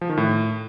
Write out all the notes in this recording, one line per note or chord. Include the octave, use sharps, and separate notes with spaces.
F3
D#3
A2